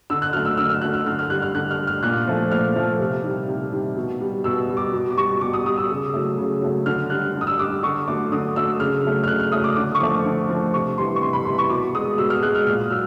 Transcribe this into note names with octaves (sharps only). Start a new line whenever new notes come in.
D3 E6
F#6
F#3 A3 F6
E6
D3 E6
F6
F#3 A3 F#6
F6
D3 F6
F6
G3 F#6
F6
D3 F#6
F6
G3
F6
A#2 F#6
F3 A3
A#2 F6
F3 A3
C3
D#3 G3
C3
D#3 G3
B2
G3
B2 E6
G3
D6
B2
D6
G3 C#6
B2 D6
D#6
G3 D#6
E6
C#3
F#3 A3
C#3
F#3 A3
D3 F6
G3 F#6
D3
D#6
E6
G3 D6
D3 C#6
F#3 A3 D6
D3 D#6
F#3 A3 E6
C#3 F6
F#3 A3
F6
C#3 F#6
F6
F#3 A3 D#6
D6
D3 D6
C#6
F3 A3 D6
D3
F3 A3
C3 C#6
E3 G3 C6
C#6
C3 C6
B5
E3 G3 C6
C#6
B2 D6
G#3 D#6
B2 E6
F6
G#3 F#6
F6
A#2 F6
F#3 E6